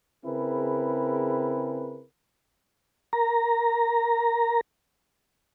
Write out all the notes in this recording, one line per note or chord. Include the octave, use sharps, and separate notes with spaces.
C#3 C4 E4 G#4 A#4 B4
A#4 A#5